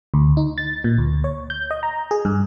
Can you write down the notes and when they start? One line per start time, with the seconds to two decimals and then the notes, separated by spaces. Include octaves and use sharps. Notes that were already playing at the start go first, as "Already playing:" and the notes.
0.14 D2
0.37 D#4
0.58 A6
0.84 A#2
0.98 D2
1.24 C#5
1.50 G6
1.71 D#5
1.83 A#5
2.11 G#4
2.25 G2